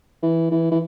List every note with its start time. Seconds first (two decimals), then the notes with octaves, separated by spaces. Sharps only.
0.22 E3
0.51 E3
0.71 E3